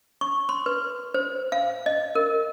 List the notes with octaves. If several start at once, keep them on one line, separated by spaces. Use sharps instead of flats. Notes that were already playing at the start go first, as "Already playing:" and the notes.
C#6
C6
B4
C5
F5
D#5
A#4